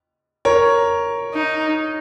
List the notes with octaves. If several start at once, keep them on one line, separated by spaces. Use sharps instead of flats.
A#4 C#5
D#4